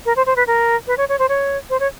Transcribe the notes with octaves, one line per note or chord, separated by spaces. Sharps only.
A#4
C5
C5
B4
A#4
B4
C#5
C#5
C5
C#5
C5
C#5